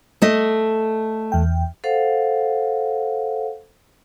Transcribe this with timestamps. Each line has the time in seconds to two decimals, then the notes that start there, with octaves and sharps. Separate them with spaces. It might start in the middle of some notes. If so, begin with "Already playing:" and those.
0.22 A3 D#5
1.32 E2 G5
1.84 A4 C5 F5 F#5